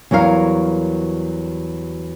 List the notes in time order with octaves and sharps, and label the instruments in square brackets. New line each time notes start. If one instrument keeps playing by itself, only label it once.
[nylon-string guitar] E2 F#3 G3 A#4 F5